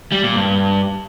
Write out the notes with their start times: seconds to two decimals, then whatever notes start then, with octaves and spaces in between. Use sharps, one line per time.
0.12 G3
0.24 A#2
0.36 G2